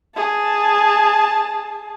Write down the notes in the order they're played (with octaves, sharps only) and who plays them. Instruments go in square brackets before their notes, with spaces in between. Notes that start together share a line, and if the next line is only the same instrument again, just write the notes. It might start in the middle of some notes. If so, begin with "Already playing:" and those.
[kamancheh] G#4 A5